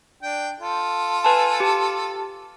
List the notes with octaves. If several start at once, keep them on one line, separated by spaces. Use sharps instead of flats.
D4 G5
F4 A4
B4 G#5 A5
G4 A5